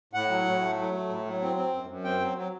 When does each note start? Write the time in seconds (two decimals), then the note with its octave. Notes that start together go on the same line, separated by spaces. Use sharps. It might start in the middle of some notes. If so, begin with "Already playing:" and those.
0.13 A2 F#5
0.29 F#3
0.45 A2
0.61 A3
0.77 F#3
0.94 A3
1.09 A2
1.25 F#3
1.41 C4
1.56 C4
1.73 F#2
1.88 F#2
2.04 C4 G5
2.20 F#3
2.36 F#3